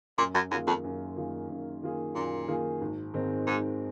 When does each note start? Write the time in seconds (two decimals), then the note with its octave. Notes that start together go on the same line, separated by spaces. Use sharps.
0.18 F#2 A#2
0.34 F#2
0.51 F#2 D#3 A#3 F4 G#4
0.67 F2
0.84 F#2
1.16 D#3 A#3 F4 G#4
1.49 F#2
1.82 D#3 A#3 F4 G#4
2.15 F#2 A#2
2.48 D#3 A#3 F4 G#4
2.81 G#1
3.13 G#2 D#3 G#3 C4
3.47 G#1 G#2